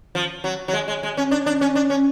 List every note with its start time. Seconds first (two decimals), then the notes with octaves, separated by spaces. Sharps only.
0.15 F3
0.44 F#3
0.68 F#3
0.73 G#3
0.88 G#3
1.03 G#3
1.17 C#4
1.31 D4
1.46 D4
1.61 C#4
1.75 D4
1.90 C#4